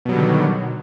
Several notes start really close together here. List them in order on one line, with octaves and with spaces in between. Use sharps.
B2 F#3 G3 D3 D#3